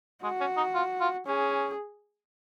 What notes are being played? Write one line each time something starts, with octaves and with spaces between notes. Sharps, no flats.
G#3 F#4
C#4
D#4
F4
F4
C#4 G#4